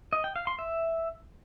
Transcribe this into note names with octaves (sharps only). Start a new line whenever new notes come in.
D#5
G5
F5
C6
E5